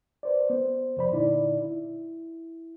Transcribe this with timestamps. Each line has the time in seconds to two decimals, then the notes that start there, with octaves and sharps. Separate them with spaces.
0.23 B4 C5 D5
0.50 B3 C5
0.97 F2 C3 F3 C5 D5 B5
1.12 A#2 D3 D#4 E4 D5
1.62 E4